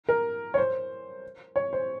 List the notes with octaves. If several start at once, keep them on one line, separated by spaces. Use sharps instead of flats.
A#4
C#5
C5
C#5
C5